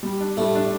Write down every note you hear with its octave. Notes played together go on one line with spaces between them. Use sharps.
G3
D4
A2 G3 A3
D4